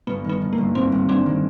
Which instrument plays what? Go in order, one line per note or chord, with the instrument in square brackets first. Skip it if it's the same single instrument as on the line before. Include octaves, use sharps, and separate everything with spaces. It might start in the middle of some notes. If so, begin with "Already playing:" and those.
[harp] G1 [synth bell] B3
[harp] D#3
[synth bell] B3
[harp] D#3
[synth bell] A#3
[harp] G1
[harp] G1 [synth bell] C4
[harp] G1
[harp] G1 [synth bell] C4 D4
[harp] D#3